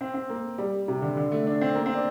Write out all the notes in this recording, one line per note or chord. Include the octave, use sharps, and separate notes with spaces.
C4
C4
A#3
G3
C3
D3
D3
A3
D4
C4
A#3
C4
D4